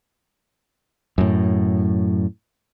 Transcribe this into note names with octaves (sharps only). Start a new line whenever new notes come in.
F#2 A2